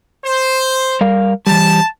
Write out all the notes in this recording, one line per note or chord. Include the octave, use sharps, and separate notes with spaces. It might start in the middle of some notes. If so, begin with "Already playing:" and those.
C5
G3 A#4 F5
E3 G3 A5